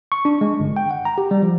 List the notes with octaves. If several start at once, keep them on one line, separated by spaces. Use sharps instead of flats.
C#6
D4
G#3
G1
G5
F#5
A#5
G4
G3
F3